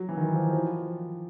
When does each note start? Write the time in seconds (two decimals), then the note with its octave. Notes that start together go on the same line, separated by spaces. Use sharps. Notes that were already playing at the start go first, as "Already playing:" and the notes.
Already playing: F#3
0.09 E3
0.17 D#3
0.34 F3
0.53 F3